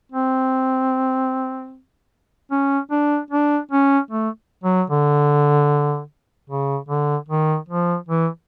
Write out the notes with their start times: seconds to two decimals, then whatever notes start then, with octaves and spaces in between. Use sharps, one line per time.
0.12 C4
2.51 C#4
2.91 D4
3.31 D4
3.71 C#4
4.11 A3
4.64 F#3
4.90 D3
6.50 C#3
6.89 D3
7.29 D#3
7.68 F3
8.08 E3